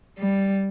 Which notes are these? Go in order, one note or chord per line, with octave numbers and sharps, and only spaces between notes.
G3